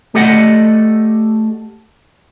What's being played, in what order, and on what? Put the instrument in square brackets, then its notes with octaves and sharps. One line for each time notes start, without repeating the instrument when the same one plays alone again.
[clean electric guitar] A3 G4 A4 D5 D#5 F#5